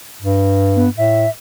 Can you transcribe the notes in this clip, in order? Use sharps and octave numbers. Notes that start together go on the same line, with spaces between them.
G2
B3
A2 E5